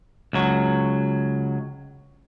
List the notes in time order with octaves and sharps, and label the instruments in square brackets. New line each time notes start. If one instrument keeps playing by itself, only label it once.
[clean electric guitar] C#2 F#3